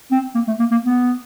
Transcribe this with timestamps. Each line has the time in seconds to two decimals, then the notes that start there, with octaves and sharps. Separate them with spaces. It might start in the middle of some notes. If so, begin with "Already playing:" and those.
0.11 C4
0.35 A#3
0.47 A3
0.59 A#3
0.71 A#3
0.84 B3